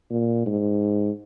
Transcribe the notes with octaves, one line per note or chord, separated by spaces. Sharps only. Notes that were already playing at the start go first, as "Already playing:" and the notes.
A#2
G#2